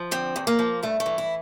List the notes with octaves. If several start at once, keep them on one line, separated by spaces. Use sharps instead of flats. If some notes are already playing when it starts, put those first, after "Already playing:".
Already playing: F3
D3 C4
E2
A#3
F3
G2 A3
A3
E3
E4